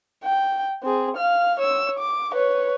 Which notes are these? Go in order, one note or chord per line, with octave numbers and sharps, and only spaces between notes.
G5
C4 G#4
F5 F6
C#5 E6
D6
B4 C#5